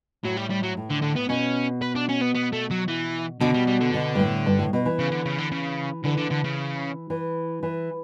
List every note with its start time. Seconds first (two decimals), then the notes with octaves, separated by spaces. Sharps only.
0.24 A2 F#3
0.37 G3
0.50 G3
0.63 F#3
0.77 A2
0.90 D3
1.02 D3
1.16 B3
1.29 B2 C#4
1.82 B4
1.96 D4
2.09 C#4
2.21 B3
2.35 B3
2.53 A3
2.71 F#3
2.88 E3
3.40 B2 D3
3.54 G3
3.67 G3
3.80 D3
3.94 B2
4.15 G2
4.19 A2
4.46 G2
4.59 A2
4.73 B2
4.85 E3
4.99 C#3
5.12 D3
5.26 C#3
5.38 D3
5.52 C#3
6.04 D3 E3
6.18 D3
6.31 D3
6.44 C#3
7.10 E3
7.63 E3